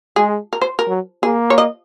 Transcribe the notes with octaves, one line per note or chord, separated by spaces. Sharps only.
G#3 G#4
A#4
C5
A#4
F#3
A#3 G#4
C#5
D#5